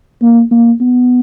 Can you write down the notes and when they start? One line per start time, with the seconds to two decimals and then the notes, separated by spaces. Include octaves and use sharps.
0.22 A#3
0.52 A#3
0.81 B3